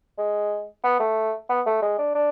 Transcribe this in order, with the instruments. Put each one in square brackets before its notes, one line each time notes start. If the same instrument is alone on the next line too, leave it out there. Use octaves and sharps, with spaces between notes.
[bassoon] G#3
B3
A3
B3
A3
G#3
D4
D4